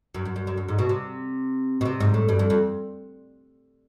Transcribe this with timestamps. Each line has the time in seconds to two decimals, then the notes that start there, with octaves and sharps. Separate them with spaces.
0.14 F#2
0.25 F#2
0.36 F#2
0.47 F#2
0.57 F#2
0.68 G#2
0.79 B2
0.89 C3
1.81 B2
1.85 C3
2.00 G#2
2.14 A2
2.29 G2
2.39 F2
2.50 F2